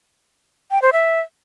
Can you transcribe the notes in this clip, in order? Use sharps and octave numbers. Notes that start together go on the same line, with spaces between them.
G5
C5
E5